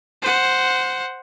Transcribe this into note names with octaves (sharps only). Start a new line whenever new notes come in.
C5 F#5